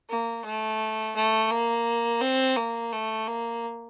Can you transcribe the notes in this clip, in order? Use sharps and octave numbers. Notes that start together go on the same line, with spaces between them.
A#3
A3
A3
A#3
C4
A#3
A3
A#3